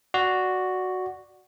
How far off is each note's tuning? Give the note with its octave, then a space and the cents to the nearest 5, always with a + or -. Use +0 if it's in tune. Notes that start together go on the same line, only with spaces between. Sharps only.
F#4 +0 D5 +0